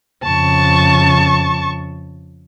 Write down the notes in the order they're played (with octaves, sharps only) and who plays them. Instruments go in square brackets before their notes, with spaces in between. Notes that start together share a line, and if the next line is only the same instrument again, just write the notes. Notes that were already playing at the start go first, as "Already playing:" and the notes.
[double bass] F2 C#3 [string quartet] A5 C#6